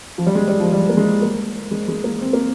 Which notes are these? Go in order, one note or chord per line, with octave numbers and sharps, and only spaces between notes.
F3
G3
G#3
G3
F3
G3
A#3
G#3
A#3
G#3
G#3
A#3
C4
A#3